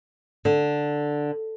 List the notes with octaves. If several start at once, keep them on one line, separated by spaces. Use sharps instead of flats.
D3